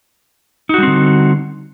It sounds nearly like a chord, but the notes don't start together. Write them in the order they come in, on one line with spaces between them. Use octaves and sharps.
D#4 F#4 G3 C4 D3